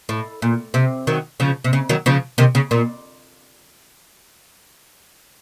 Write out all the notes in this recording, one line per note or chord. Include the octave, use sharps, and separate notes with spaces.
A2
A#2
C3
D#3 F#3
C#3 F3
C3
C#3
D#3 F#3
C#3 F3
C3 D#3
C#3
A#2